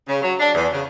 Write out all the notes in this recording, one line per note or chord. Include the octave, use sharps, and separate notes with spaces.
C#3
F#3
D4
E2
C#3